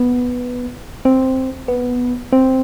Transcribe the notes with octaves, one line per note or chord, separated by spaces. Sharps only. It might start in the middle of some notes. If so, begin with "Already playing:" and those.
Already playing: B3
C4
B3
C4